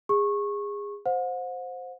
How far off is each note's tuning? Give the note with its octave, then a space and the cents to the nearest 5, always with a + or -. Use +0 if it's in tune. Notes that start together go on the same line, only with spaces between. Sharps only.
G#4 -25 C#6 -20
C5 +0 F#5 -40